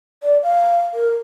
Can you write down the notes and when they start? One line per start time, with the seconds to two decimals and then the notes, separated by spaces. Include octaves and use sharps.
0.23 D5
0.43 F5
0.94 A#4